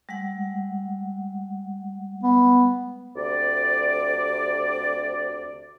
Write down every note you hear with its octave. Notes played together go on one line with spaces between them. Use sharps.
G3 G#3 F#5
B3
D2 C3 D5